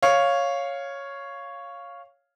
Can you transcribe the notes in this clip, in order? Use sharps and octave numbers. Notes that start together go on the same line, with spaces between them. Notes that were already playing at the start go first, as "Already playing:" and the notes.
C#5 F5